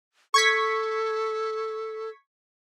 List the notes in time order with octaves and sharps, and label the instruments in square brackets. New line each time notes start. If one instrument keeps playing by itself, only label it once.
[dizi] A4 [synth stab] C#6 G#6 B6